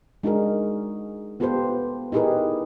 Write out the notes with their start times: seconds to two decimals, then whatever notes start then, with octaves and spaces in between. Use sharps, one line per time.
0.23 G#3 D4 D#4 F#4 G#4 A#4
1.40 B3 F4 G4 A4 B4 C5
2.12 D#4 E4 G4 G#4 A#4 B4